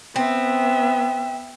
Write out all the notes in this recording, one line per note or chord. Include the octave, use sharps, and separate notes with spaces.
B3 C4 E5